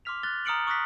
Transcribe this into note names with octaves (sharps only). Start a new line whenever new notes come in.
C6 D6 E6 F6 B6 F7
F6 F#6 A6 G7
A#5 D#6 F6 C#7 D7 F#7
C#6 D#6 F#6 A#6 B6